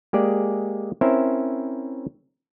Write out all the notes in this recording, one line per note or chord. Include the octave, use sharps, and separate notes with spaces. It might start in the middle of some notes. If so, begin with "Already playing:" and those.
G#3 A#3 G4 G#4 D5
C4 C#4 E4 A#4 C5 E5